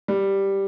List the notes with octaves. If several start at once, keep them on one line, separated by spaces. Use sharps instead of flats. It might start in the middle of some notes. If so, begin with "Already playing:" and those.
G3